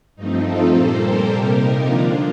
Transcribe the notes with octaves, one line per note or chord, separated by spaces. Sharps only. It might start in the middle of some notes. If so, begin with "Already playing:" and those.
G2 F3 A3 C4 D#4
F4 A4
A#2 G3 A#3 A4 C5
G4 A#4
C3 G3 A#3
D#4 G4
D3 F3 A#3 D4 F4